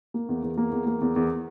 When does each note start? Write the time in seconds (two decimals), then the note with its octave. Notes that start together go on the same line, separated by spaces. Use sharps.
0.14 A#3
0.29 E2
0.43 E2
0.57 A#3
0.72 E2
0.87 A#3
1.01 E2
1.16 E2